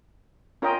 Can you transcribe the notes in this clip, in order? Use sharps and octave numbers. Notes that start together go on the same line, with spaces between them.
C#4 F4 A#4 D#5 G5